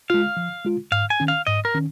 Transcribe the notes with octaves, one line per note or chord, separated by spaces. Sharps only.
G#3 F4 F5
F3
G#3 F4
G#2 F5
G#5
D#3 C#4
F5
G#2 D#5
A#4
D#3 C#4